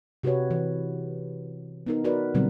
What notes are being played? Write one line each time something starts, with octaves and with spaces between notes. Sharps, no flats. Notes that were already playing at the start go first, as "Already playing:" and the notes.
C3 F#4 G4 B4 C#5
E3
B3 D#4 A#4
F#4 A#4 B4 D5
B2 D3 F#3 G3 C4